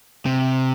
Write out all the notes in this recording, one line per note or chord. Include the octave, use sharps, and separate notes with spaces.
C3